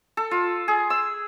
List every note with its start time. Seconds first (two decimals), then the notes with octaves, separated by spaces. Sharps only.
0.17 A4
0.31 F4
0.68 G#4
0.90 E6